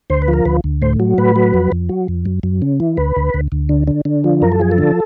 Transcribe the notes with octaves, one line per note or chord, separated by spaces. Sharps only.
D2 C5
B4
F3
A#4
D2 B4
D2
A2 C5
F#3
A2 B4
F#3
F2
F2
F#3
F2
F#2
F#2
C#3
E3
D2 B4
D2
D2
D2
D3
D3
D3
F3
F#2 A#4
A4
F3 G#4
A4
D3